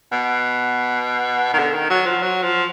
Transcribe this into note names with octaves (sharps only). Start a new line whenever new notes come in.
B2
D#3
D3
D#3
F#3
F3
F#3
F3